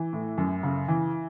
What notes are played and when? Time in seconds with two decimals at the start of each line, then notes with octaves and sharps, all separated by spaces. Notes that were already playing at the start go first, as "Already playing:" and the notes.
Already playing: E3
0.13 A2
0.38 F#2
0.63 C#3
0.88 E3